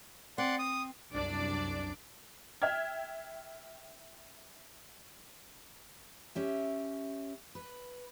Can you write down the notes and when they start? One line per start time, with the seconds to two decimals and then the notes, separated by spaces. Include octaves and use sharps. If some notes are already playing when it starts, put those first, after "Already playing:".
0.38 C4 D5 F#5 C6
0.59 D#6
1.12 C2 F#2 D4 D5 D6
2.62 E5 G5 F6 G#6
6.35 C#4 G4 E5
7.55 B4